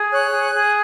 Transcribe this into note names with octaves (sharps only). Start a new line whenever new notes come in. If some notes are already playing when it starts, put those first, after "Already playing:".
Already playing: G#4
C#5 F#6
G#4
G#4